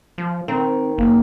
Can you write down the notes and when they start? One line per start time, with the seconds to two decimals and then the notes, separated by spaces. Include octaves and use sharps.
0.18 F3
0.48 D#3 C4
0.98 F#1 A#3